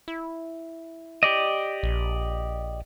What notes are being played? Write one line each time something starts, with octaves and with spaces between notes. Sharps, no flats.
E4
G4 D5 D#5
A#1